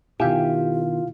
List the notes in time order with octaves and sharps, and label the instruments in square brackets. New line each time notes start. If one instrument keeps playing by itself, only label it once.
[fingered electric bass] B2 D#3 [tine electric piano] E4 F5 [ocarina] F4 [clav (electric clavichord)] G4 E5 G#5